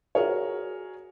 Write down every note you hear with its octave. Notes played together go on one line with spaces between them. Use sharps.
F#4 G#4 A#4 C#5